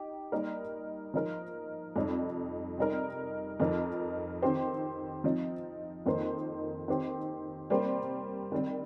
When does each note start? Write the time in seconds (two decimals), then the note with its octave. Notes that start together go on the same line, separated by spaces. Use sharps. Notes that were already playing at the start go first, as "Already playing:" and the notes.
Already playing: D#4 G4
0.32 G3 A#3 D#4 A#4
1.14 F3 D#4 A#4
1.96 F2 C3 G3 D#4
2.78 C3 G3 D#4 A#4
3.60 F2 F3 D#4 A#4
4.42 D#3 C4 G4 C5
5.24 F3 C4 D#4
6.06 F2 D#3 A#3 D#4 C5
6.88 D#3 C4 G4 C5
7.69 C3 G3 A#3 G4 C5
8.52 D#3 G3 C4